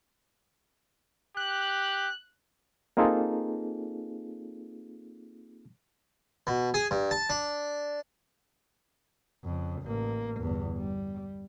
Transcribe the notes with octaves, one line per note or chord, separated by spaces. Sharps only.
G4 F#6
A#3 C4 D#4 F4 G#4 A4
B2
G#4
G2
A5
D4
F2 C#3
A1 A#3
G1 E2
G3